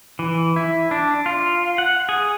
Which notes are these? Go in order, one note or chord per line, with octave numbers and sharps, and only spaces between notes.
E3
E4
D4
F4
F#5
G#4